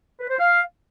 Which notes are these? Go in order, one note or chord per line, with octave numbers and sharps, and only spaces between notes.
B4
C5
F5